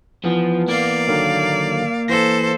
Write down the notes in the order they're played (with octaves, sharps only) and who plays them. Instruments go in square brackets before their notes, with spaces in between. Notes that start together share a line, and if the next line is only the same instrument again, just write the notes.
[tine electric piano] E3 B3 [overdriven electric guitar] F3
[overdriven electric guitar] A#3 [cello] D5 F5
[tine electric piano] D3 D#3 F#3
[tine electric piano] E3 A#6 [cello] A4 C5